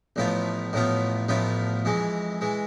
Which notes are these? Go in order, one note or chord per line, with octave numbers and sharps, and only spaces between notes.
A1 A2 F3 B3 F4
A1 A2 F3 B3 F4
A1 A2 F3 B3 F4
F2 E3 G#3
E3 G#3